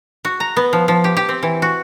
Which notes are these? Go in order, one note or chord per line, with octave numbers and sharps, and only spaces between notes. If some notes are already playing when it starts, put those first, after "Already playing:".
F#4
A#5
B3
F3
F3
G4
G4
C4
E3
F#4